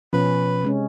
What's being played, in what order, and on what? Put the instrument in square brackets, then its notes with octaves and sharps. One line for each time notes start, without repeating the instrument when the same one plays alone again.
[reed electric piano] B2 F3 [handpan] C#4 [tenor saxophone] B4
[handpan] C3 G#3 C#4